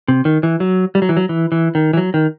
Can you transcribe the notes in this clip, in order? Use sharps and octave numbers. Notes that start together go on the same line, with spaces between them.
C3
D#3
E3
F#3
G3
F#3
E3
F#3
E3
E3
D#3
E3
F#3
D#3